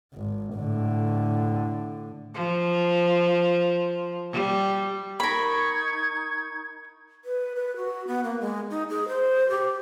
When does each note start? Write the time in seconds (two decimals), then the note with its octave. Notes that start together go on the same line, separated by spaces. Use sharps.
0.14 G#1
0.56 A2 D3
2.34 F3
4.32 G3
5.20 D#4 A#4 B5 C#6 G#6
7.25 B4
7.56 B4
7.77 F#4
8.07 B3
8.24 A#3
8.40 G#3
8.70 D#4
8.89 G#4
9.08 C5
9.49 G4